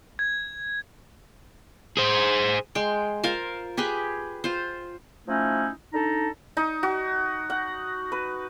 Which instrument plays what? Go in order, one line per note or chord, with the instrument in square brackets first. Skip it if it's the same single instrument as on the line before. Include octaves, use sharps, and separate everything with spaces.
[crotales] G#6
[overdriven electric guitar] G#4 C5
[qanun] G#3 G5 C6
F4 A#4 C5 F5
G4 G#4 B4 G5
F4 C5
[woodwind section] F3 A3 C#4 D#4 E4
D4 D#4 A4 A#5
[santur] D#4
F#4
F#5
B4